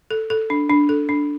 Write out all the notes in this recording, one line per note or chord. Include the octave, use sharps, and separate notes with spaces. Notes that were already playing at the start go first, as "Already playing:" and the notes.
A4
A4
D4
D4
A4
D4